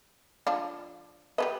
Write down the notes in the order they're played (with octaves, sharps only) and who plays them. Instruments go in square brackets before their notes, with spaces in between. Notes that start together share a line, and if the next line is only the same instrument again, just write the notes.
[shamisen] F3 D4 F4
[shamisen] G4 A4 D#5 [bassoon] B4